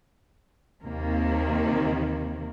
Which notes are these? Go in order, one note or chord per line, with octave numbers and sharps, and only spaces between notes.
D#2 C3 D#3 A#3